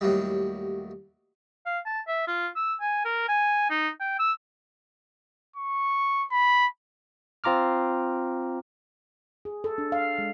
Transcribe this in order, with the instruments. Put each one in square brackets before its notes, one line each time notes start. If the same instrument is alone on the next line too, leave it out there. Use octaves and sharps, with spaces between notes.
[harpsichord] D#2 A2 F#3 G3
[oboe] F5
A5
E5
F4
E6
G#5
A#4
G#5
D#4
G5
E6
[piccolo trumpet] C#6
B5
[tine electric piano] C4 F4 A#5 D6 F6
[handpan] G#4
A4
D4
F5
G#3